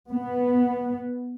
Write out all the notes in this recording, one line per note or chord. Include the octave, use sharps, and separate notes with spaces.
B3